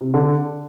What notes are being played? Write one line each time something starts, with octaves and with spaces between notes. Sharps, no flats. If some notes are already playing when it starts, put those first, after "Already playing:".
C3
D3